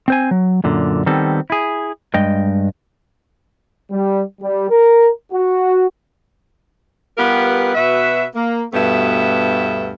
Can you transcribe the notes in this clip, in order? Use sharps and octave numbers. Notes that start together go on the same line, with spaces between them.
C4 C5 G#5
F#3
F#2 A#2 D3
D#3 G3 B3 C4 A4
E4 G#4
G2 G#3 D#5 G5
G3
G3
A#4
F#4
G3 B3 F4 G4 A#4 B4
B2 F#4 B4 E5
A#3
D2 G2 B2 A3 B3 E5